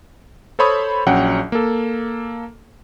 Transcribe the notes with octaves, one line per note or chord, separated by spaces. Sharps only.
A4 C5 C#5 B5 D#6
A#1 F#3 C#4 F#5 G5
A#3 A4